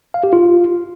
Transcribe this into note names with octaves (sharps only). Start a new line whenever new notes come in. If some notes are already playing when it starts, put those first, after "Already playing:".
F5
G4
F4